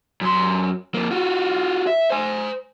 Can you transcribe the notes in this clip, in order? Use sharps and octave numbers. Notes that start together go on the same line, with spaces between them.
F#2 C6
F2 A#3
F4 F#4
E5
C5 G#5